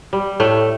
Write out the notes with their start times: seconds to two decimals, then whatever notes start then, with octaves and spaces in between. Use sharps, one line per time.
0.13 G3
0.40 A2 A3